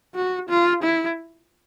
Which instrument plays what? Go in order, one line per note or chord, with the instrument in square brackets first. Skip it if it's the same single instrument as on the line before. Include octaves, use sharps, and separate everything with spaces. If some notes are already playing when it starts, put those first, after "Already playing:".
[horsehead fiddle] F#4
F4
E4